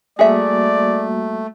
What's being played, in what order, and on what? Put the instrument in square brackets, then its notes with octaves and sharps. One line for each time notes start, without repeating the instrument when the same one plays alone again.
[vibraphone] G3 A#3 F#4 [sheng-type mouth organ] A3 [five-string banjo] G#4 E5 [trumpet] D5